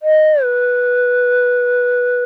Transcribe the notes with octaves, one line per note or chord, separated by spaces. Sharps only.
D#5
B4